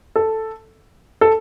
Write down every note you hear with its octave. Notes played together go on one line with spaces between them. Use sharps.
A4
A4